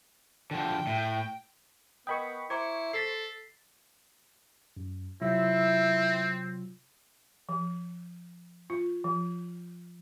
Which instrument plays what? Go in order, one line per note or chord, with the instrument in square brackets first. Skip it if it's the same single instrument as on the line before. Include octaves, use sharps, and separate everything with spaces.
[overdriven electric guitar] D3 F3 [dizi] G5
[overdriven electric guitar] A2
[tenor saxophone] B3 [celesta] A#4 D#5 D#6 [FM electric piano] G5 B5 C#6
[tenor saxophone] E4 [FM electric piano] C5 C#6 [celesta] A#5 D6 G#6
[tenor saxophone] A4 [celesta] A6 B6 C7
[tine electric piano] F#2
[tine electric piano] C3 F#3 F4 [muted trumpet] C4 [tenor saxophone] E4
[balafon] F3
F4
F3